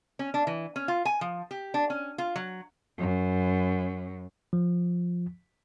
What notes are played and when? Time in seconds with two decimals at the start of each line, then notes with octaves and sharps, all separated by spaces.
0.19 C#4
0.34 D4
0.47 E3
0.76 C#4
0.88 F4
1.05 G#5
1.21 F3
1.51 G4
1.74 D4
1.90 C#4
2.18 F4
2.36 F#3
2.98 F#2
4.53 F3